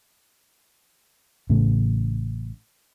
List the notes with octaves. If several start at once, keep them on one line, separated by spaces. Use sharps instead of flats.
A1 A2 C#3